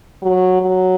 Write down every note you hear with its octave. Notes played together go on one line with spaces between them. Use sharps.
F#3
F#3